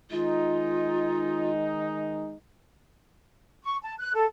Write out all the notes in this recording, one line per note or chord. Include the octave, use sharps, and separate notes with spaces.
D#3 G#3 D#4 F4
C#6
A5
F#6
A4